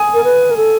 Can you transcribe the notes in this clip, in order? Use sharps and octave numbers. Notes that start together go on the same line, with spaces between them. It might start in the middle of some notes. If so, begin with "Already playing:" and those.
Already playing: G#5 D#6
A#4
B4
A#4
A4